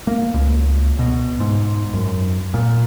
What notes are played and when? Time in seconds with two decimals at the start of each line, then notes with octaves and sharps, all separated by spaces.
0.07 A#3
0.34 C#2
0.99 B2
1.40 G#2
1.93 F#2
2.54 A#2